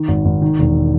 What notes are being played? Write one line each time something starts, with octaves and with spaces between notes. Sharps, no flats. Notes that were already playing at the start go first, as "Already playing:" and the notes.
Already playing: D#3
G#1
G#1
D#3
E1